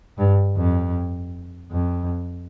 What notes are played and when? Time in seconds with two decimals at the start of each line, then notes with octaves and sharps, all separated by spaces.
0.18 G2
0.57 F2
1.72 F2